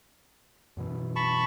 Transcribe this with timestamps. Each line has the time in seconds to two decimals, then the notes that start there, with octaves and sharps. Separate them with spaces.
0.77 F#2 B2 E3
1.16 A5 B5 C#6